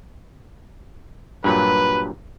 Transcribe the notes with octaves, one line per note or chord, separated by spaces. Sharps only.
G2 A#2 F#3 B4